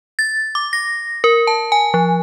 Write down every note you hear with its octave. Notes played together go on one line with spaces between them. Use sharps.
A6
D6
A#6
A#4
A5
G#5
F3